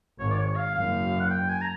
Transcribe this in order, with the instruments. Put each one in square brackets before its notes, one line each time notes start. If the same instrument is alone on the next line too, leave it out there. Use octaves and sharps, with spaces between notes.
[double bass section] G#1 G#2 [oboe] C#5
[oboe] D5
C#5
F5
[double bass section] F#1 F#2 [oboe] F5
[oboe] F#5
G5
G#5
A#5